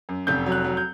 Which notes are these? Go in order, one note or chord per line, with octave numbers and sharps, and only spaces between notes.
F#2
F1 G6
F#3
F#6
F#3
G6